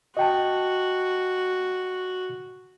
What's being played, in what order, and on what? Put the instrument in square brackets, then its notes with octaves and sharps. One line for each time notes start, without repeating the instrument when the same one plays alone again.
[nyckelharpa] F#4 [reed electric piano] D#5 G5 A5